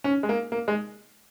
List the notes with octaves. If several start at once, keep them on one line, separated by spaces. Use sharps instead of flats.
C#4
G#3
A#3
A#3
G#3